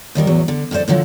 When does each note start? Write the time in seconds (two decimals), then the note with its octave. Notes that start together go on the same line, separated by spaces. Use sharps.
0.15 D#2 D#3 G3 A#4
0.27 E2 A2 F#3
0.48 D3
0.71 F2 A2 A4 C5 D5
0.88 A2 D3 F3 F#3